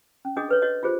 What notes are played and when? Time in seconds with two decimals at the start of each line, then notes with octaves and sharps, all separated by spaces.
0.25 C#4
0.36 D4 F#4 G#4 D#5 D#6
0.49 A4 B4 C#5
0.62 F#4 C#5 D#5
0.83 F4 G4 G#4 C5